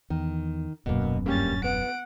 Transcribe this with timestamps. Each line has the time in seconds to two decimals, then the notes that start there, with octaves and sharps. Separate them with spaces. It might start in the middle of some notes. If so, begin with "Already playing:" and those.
0.10 E2 D#3
0.86 D#1 F#2 B2 A#3
1.26 G2 G3 A#3 C#4 A6
1.64 B3 F#5 D7